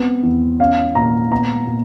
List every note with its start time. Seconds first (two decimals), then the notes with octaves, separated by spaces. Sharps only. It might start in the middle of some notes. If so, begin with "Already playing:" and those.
Already playing: B3 C4
0.23 E2
0.59 C#4 F5
0.95 A#2 A#5
1.31 B3 A#5
1.67 A#2